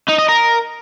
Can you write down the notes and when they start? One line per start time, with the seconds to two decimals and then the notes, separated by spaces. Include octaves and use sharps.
0.08 D#4
0.18 D#5
0.29 A#4